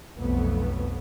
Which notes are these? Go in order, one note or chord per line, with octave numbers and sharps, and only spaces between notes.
B1 F2 F#3 A3 B3